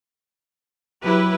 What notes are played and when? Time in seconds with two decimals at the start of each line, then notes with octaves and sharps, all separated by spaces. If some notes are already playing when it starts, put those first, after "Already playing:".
1.04 F#3 E4 G4 B4